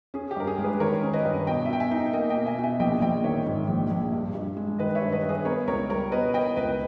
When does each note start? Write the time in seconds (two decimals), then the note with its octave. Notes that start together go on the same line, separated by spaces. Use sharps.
0.14 C#4 G#4
0.31 G4
0.36 G2 A#4
0.47 G#4
0.58 G#3
0.64 G#4 B4
0.80 D#3 A#4 C#5
1.03 C#4
1.13 B4 D#5
1.25 G2
1.47 B2 D#5 G5
1.66 E5
1.69 B2 G5
1.80 E5 G#5
1.91 D#4
2.13 A#3 D#5 G5
2.30 D#5 G5
2.35 B2
2.46 E5 G#5
2.58 B2
2.64 E5 G#5
2.79 A#1 D#5 G5
3.01 A#1 D#5 G5
3.24 D#3 C#5 E5
3.46 G#2
3.68 A#1
3.91 A#1
4.13 G2
4.35 G2
4.57 G#3
4.79 D#3 B4 D#5
4.95 C#5 E5
5.02 G2
5.12 B4 D#5
5.23 G2
5.29 G#4 B4
5.45 B3 A#4 C#5
5.67 C#2 A#4 C#5
5.90 G3 A#4 C#5
6.12 B2 B4 D#5
6.34 B3 D#5 G5
6.57 C#2 B4 D#5